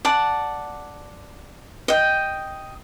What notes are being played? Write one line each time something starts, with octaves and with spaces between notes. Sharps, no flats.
D5 F#5 A5
D#5 G5